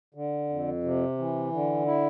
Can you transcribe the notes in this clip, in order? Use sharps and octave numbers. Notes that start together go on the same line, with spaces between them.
D3
F2
C3
E3
D3
E4